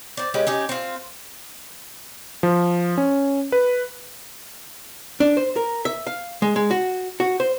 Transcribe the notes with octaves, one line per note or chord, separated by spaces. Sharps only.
C4 D5
G#3 C#4 G4 B4
C#4 D#4 G4
C4 F4
F3
C#4
B4
D4
C5
A#4
E5
F5
G#3
G#3
F#4
F#4
C5